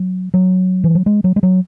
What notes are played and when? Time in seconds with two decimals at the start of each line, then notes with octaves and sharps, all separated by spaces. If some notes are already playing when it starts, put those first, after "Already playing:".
Already playing: F#3
0.34 F#3
0.84 E3
0.95 F#3
1.06 G#3
1.24 F#3
1.36 G#3
1.43 F#3